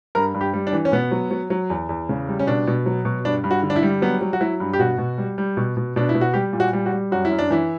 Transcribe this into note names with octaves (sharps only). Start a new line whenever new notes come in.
G2 A#4
G2
G4
G3
D4
E3
C#4
B2 B3
F#3
F#3
F#3
E2
E2
C#3
G3
C#4
B2 D4
B2
F#3
B2
G2 D4
G2
F#4
D3
D4
E4
G3
F#3 B3
F#3
F#4
F#3 E4
G2
G4
B2 F#4
B2
G3
G3
B2
B2
B2 D4
E4
B2
F#4
G3 G4
A#2
F#4
G3
F#4
G3
F#2 F#4
E4
F#2
D4
E3 E4